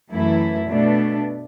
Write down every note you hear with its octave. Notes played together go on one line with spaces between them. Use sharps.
F#2 E3 A3 E4
B2 A3 D4